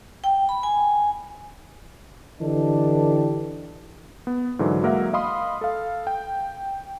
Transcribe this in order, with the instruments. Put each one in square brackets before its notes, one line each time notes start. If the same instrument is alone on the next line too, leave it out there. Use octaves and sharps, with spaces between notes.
[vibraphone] G5
B5
G#5
[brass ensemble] D3 E3 D4 G4 A4 D#5
[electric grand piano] B3
G#2 D3 E3 F#3
F#3 G#3 A#3 A#4 E5 F#5
D#5 F5 B5 C6 D#6
A4 F5
G5